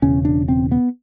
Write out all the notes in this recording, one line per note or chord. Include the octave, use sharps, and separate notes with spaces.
E1 E2 C#3 C#4
D4
C4
B3